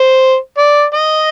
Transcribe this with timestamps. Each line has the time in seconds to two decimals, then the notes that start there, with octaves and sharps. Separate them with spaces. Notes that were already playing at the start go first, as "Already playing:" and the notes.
Already playing: C5
0.58 D5
0.94 D#5